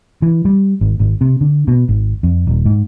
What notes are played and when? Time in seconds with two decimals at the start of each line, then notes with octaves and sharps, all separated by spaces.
0.22 E3
0.45 G3
0.81 G#1
1.00 G#1
1.21 C3
1.41 D3
1.68 B2
1.89 G#1
2.23 F2
2.47 D#1
2.65 G#2